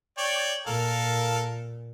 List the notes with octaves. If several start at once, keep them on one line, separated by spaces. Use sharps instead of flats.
C#5 D5 G5
A#2 A4 A#4 F5